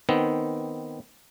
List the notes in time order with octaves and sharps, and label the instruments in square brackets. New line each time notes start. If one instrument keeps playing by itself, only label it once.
[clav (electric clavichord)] D#3 B3 C4